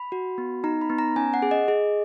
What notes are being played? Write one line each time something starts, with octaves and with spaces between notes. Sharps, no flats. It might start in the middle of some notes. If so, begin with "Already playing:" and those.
Already playing: B5
F#4
B3
D#4 A#5
B5
B3
A#5
C#4 G#5
F#5
G#4
D#5
G#4